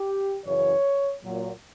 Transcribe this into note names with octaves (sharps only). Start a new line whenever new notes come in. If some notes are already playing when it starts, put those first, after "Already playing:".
Already playing: G4
F#2 C#3 E3 C#5
A#2 F#3